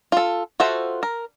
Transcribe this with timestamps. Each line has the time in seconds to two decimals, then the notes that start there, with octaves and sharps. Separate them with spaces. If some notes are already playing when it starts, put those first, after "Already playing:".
0.12 F4 A4
0.60 F4 F#4 A4 C5 E5
1.03 A#4